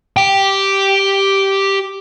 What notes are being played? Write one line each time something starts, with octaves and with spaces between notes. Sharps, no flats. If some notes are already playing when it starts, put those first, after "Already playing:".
G4 G5